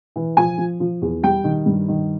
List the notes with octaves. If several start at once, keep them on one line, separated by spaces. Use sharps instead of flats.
E3
F3 G#5
F3
F3
E2
G3 G5
D#3
G2
D#3